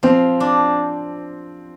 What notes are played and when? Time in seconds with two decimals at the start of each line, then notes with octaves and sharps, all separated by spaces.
0.03 F3 C4
0.40 D4